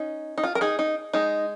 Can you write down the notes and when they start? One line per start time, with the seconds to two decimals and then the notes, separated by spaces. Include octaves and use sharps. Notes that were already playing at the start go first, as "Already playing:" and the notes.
Already playing: C#4 D#4
0.38 D#4
0.43 F4
0.55 A#4
0.61 D#4 G#4
0.79 D#4
1.13 G#3 D#4